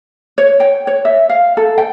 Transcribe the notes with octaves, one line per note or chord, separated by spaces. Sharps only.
C#5
G5
C#5
E5
F5
A4
G5